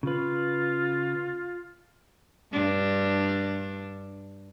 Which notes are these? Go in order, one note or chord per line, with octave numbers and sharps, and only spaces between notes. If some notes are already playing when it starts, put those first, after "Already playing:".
C#3 F4 B4
G2 D4